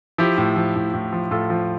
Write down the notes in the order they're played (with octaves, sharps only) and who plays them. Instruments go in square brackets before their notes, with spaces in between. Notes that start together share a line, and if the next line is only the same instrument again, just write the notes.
[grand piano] F3 E4 G4
A2
F3
A2
A2
F3
A2 F4 A4
F3